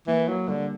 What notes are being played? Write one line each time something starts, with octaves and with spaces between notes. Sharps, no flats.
E3 A#3
F#3
D3 G3